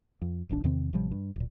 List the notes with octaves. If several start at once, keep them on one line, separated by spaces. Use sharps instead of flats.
F2
D1 A1 D#2 D4
E2 C3 D#3 C4
A1 C3 F3 G3
G2
D1 A#2